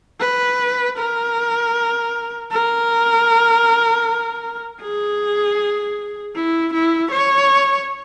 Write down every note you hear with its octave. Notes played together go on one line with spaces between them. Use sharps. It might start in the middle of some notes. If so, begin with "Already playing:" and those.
B4
A#4
A#4
G#4
E4
E4
C#5